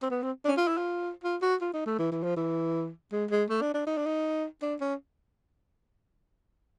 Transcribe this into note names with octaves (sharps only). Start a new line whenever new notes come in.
C4
B3
C4
D4
C#4
F4
E4
F4
F4
F#4
F4
D#4
A3
E3
E3
F3
E3
G#3
G#3
A3
D4
D4
D#4
D4
D#4
D4
C#4